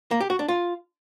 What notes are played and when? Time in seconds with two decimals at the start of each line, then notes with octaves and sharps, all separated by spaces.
0.11 A#3
0.20 G4
0.30 F#4
0.39 D4
0.48 F4